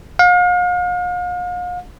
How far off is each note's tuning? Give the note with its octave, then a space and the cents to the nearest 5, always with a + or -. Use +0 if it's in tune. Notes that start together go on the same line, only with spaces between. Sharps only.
F5 +40